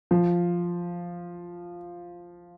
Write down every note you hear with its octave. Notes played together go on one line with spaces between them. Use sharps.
F3